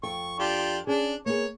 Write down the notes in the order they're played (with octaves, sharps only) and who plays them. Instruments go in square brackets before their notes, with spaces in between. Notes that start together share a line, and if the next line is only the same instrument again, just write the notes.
[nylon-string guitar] F2 A4 G5 [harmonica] C#6
[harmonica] D4 F4 G4
[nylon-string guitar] C#4 G#4 [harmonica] D4
[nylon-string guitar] A#3 B3 G#4 [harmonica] C#5